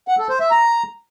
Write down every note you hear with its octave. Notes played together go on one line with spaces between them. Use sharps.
F#5
A4
C5
E5
A#5